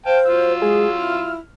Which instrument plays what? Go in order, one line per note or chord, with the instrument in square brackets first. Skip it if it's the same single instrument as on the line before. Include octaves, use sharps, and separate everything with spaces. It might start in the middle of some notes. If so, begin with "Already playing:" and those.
[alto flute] C5 [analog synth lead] F5 [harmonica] G5 A5
[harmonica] F#3 F4 E6
[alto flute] G#3 [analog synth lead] G#4
[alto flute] E4 [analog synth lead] F6